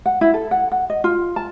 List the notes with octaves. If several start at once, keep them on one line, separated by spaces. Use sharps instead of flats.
F#5
E4
A4
F#5
F#5
D#5
F4
A5